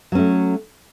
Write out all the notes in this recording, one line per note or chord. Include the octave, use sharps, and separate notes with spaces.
F#3 A3 C#4